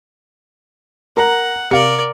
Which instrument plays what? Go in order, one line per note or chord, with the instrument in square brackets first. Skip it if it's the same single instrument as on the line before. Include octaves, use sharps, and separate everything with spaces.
[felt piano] A#4 A#5 [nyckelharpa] F#5
[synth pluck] C3 F5 [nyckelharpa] A#4 D5 [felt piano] C#7